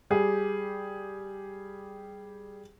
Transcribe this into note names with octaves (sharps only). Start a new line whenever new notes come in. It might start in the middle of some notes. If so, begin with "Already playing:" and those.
G3 G4 G#4